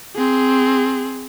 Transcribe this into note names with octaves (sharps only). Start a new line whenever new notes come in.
C4 G#4